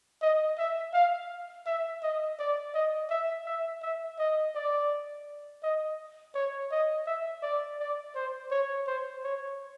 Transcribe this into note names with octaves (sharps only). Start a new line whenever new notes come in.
D#5
E5
F5
E5
D#5
D5
D#5
E5
E5
E5
D#5
D5
D#5
C#5
D#5
E5
D5
D5
C5
C#5
C5
C#5